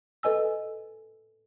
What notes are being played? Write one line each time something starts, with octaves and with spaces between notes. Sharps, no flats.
A4 B4 D#5 G#5 E6